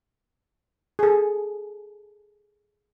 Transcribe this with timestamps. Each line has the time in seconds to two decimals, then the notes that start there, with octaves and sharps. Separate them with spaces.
0.99 G#4 A4